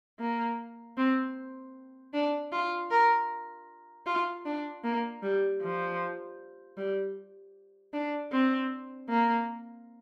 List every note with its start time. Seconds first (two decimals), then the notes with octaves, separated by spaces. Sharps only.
0.20 A#3
0.98 C4
2.13 D4
2.52 F4
2.91 A#4
4.06 F4
4.45 D4
4.84 A#3
5.23 G3
5.62 F3
6.77 G3
7.93 D4
8.32 C4
9.09 A#3